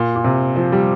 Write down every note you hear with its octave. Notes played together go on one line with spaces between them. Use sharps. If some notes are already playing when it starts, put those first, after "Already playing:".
Already playing: A#2
A#2
C3
F3
G3